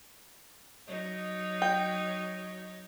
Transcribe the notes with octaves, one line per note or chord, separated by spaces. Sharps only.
F#3 D#4 C#5
G5